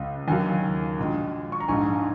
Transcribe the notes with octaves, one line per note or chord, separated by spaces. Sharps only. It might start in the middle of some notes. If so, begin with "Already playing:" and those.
Already playing: C#2 C#3 G#3
D#2 D#3 F#3 A#3 G#5
A#1 A#2 G#3
C#6
A#5
A#1 G#2 G#3 G#5